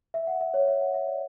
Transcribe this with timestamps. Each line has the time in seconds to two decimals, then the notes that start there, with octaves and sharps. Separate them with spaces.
0.14 E5
0.27 F#5
0.41 E5
0.54 C#5
0.68 E5
0.81 F#5
0.94 E5
1.07 D5